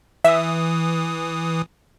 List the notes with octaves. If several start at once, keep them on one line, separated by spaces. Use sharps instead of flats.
E3 E5 D#6